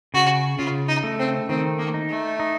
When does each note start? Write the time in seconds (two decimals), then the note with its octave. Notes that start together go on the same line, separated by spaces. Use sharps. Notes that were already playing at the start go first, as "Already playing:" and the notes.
0.14 C#3 F#4
0.59 C#3 F4
0.88 D#4
1.03 A3
1.19 C4
1.49 D#3 C4
1.79 A#3
1.94 D#4
2.09 A3
2.40 D#4